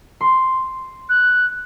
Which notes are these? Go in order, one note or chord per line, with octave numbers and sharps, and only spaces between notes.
C6
F#6